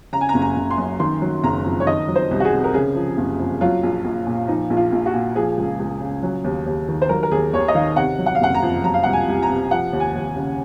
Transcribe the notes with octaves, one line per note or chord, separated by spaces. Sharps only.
C#3 A#5
G#5
A#5
F#1
A#5
F#1
C6
F#2
D#3 C6
F#3
F#1 A#5
F2
C#5
D#3 D#5
F#3
C5
C2
F#4
G#4
C3
A#4
C#3 G#4
F3
F#1
F2
F#3 F4
A#1
A#1
A#2
F3 D#4
A#1
F4
A#1
F#4
A#2
F3 G#4
C#2
C#2
C#3
F#3
D#2
D#2
D#3
C5
F#3 A#4
A#4
D#2 G#4
D#2 C#5
D#5
D#3 F5
C3 F#5
F#3
F#5
F5
F#1 F#5
A#5
F2
F#3 A#5
F5
C2 F#5
G#5
C2
A#5
C3
F3 F#5
D#2
G#5
D#2
C#3